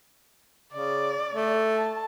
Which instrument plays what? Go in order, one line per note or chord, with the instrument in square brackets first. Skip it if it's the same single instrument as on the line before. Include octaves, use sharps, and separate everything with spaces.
[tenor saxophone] C#3 [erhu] D5
[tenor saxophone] A3
[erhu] A5